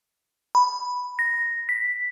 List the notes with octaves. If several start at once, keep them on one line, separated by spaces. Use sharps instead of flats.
B5
A#6
B6